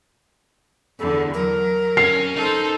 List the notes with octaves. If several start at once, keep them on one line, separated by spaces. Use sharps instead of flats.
E2 D3 A4
F#3 A#4
C#4 C7
D#4 A4 C5